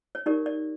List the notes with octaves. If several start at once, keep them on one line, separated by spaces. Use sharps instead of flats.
C#5
D#4 G4 A#4 D5
D5